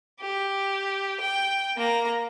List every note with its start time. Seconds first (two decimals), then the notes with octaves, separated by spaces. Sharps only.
0.21 G4
1.21 G5
1.77 A#3 A#5